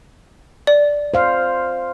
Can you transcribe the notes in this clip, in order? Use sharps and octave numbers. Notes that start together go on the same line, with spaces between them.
D5
C5 F5